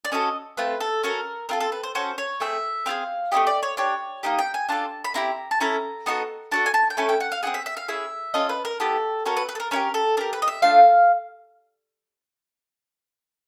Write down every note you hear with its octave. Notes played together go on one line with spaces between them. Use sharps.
D5
C#4 F#4 A4 D#5
A3 C4 F4 B4
A4
C#4 F#4 A4 A#4
C4 F4 A4 A#4
A4
B4
C5
C#4 F#4 A4 C5
C#5
A3 C4 G#4 E5
C4 F4 G#4 F5
A3 C4 E4 G4 D#5
D5
C#5
D4 G4 C#5
A#3 D#4 G4 D#5
G5
G#5
D4 F4 A4 A5
B5
C4 E4 G4 A#5
A5
C#4 E4 A4 A#5
B3 D#4 F#4 A4
D4 F#4 A4 A5
G#5
A5
G5
A3 C#4 E4 A4 G#5
G5
F#5
F5
C4 D#4 G#4 F#5
E5
E5
F5
C#4 E4 G#4 E5
C#4 F4 A4 D#5
B4
A#4
B3 E4 G4 A4
C#4 F#4 A4 A#4
B4
B4
A4
A#4
C#4 E4 G4 A#4
A4
D4 G4 A#4
B4
D#5
E5
A3 D4 F4 F5